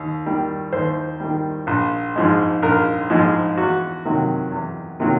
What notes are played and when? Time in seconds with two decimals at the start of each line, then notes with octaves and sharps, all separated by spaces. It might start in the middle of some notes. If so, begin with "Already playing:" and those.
Already playing: D#2
0.26 D#3 G3
0.73 D#2 C5
1.20 D#3 G3
1.67 A#1
2.16 G#2 F3 G#3
2.63 A#1 A#4
3.10 G#2 F3 G#3
3.58 E2 F#4
4.05 C3 D#3 F#3
4.51 E2
5.00 C3 D#3 F#3